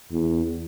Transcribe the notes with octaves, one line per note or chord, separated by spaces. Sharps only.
E2